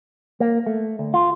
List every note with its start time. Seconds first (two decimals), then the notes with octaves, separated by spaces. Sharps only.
0.40 A#3
0.66 A3
0.99 D2
1.14 F4